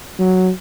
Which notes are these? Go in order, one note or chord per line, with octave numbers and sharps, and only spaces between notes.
F#3